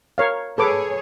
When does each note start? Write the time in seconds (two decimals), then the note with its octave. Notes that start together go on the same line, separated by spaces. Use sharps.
0.18 A#4 C#5 F5
0.58 G#4 A4 B4 C#5 D6